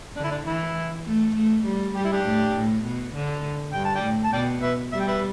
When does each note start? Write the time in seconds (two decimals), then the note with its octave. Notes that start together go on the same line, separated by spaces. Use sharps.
0.16 D3 D4
0.24 E4
0.31 D4
0.46 E3 E4
1.06 A3
1.36 A3
1.65 G3
1.95 G3 G4
2.04 E4
2.12 D4 G4
2.25 A2
2.55 A2
2.84 B2
3.14 D3
3.74 G2 G5
3.85 A5
3.96 D5 G5
4.03 A2
4.25 A5
4.33 B2 D5 G5
4.63 B4 E5
4.93 G3 E5
5.00 G5
5.08 B4 E5